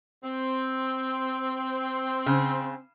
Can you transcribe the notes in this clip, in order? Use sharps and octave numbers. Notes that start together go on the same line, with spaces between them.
C4
C#3